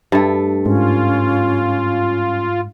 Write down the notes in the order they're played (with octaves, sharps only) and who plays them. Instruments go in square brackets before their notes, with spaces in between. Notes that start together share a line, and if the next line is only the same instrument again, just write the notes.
[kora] G2 A3
[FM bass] G#2 [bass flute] C#4 [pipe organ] F4